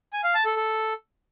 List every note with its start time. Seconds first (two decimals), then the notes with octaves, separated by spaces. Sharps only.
0.13 G#5
0.24 F5
0.35 A5
0.45 A4
0.56 A4